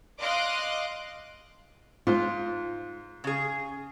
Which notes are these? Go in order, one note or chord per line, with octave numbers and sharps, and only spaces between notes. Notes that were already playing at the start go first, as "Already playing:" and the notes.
D#5 F5 C6 D6 F#6
G#2 F4
C#3 G#4